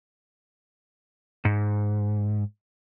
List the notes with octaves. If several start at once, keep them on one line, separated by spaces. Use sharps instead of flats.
G#2